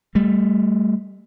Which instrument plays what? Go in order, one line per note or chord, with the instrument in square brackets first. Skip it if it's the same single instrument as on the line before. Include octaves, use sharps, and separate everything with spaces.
[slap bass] G3 A3